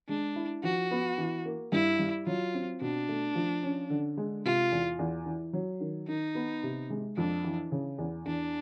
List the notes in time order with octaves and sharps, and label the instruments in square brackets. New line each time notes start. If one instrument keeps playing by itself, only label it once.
[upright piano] G#3 [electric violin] D4
[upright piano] E4
[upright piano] F3 [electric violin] F#4
[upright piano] B3
E3
A#3
[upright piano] G2 [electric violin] E4
[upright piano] G3
[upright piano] F#3 [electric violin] F4
[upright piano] C4
[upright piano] B2 [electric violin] D4
[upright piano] A3
F3
C#4
D3
G#3
[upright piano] C3 [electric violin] F4
[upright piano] E2
E2
E3
F#3
D#3
[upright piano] D#3 [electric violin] D#4
[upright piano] B3
C3
G#3
[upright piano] F2 [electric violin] D4
[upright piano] E3
C#3
E2
[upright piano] E2 [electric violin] D4